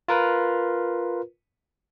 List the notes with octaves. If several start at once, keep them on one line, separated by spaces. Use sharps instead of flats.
F4 A#4 B4